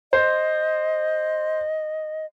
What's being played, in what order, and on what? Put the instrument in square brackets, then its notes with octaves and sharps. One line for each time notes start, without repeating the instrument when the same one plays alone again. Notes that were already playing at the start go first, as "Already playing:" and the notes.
[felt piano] C5 [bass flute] D#5